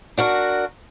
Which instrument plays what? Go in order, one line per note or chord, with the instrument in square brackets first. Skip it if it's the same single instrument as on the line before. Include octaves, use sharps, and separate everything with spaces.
[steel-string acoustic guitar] D4 F#4 A#4